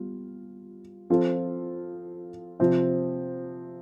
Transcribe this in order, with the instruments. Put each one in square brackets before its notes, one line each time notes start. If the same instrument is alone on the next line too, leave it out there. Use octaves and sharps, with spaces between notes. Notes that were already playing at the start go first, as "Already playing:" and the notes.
Already playing: [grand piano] G3 B3 F4
F3 C4 F4 A4
C3 F3 C4